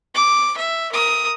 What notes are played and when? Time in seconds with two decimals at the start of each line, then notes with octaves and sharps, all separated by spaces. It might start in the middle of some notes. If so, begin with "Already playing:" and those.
0.15 D6
0.57 E5
0.91 A#4 D#6